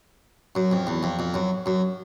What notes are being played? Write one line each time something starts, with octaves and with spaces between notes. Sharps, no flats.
F#2
F2
E2
F2
F2
F#2
F#2